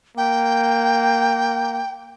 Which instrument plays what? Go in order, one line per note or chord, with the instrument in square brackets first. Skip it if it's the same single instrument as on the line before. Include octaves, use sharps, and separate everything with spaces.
[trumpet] A#3 [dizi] G5